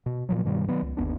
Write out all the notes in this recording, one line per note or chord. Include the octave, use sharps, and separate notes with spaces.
B2
A#2 F3 F#3
G2 B2 D#3 G3
D#3 F#3 B3
C#2
G1 D#2 B3 D4